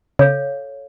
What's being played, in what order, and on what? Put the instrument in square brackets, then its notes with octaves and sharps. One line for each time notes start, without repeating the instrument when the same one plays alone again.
[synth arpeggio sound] C#3 [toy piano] A4 C#5 F5